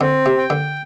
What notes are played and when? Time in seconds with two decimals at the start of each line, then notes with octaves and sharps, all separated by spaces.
0.01 D3 C4
0.26 C3
0.37 G5
0.50 D3